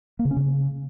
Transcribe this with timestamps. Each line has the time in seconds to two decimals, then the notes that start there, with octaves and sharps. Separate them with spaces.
0.19 A#3
0.25 C#3
0.31 C#4
0.37 C#3